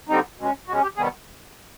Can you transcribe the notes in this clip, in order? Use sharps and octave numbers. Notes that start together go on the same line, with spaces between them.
D3 G3 C4 D#4
B2 G#3 C#4
B2 G#3 C#4 F#4
G4
C3 D#3 G3 B3 G#4